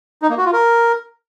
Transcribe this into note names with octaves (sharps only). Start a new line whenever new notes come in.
D#4
A#3
F#4
F4
A#4